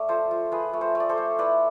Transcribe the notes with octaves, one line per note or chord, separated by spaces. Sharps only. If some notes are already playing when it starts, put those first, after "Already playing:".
Already playing: A3 D5
F3 A4 C5
F3
F3 G#4 B4
A3
A4 C5
A3
D5
A4 C5
A3
E4 B4 D5